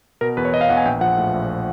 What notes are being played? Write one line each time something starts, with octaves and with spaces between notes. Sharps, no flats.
B2 A#4
E2 B4
C#5
B2 D#5
F5
E2 F#5
G#5
A#1 G5
F3 F#5
A2
A#1